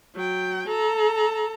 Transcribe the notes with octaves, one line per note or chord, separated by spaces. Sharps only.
F#3 G5
A4 A#5